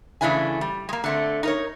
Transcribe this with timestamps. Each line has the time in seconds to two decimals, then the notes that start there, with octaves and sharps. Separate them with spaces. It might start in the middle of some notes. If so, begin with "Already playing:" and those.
0.21 C#3 E3 A3 D4 E4 G#5
0.61 G3
0.89 G#3 A#3
1.04 D3 A3 C4
1.43 D#4 A#4 C#5